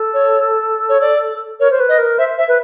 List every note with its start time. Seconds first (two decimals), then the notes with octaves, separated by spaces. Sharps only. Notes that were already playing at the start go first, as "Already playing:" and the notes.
Already playing: A4
0.14 C#5
0.89 C#5
1.01 D5
1.60 A#4 C#5
1.70 C5
1.80 B4
1.89 D#5
1.98 A#4
2.18 C5 E5
2.38 E5
2.48 B4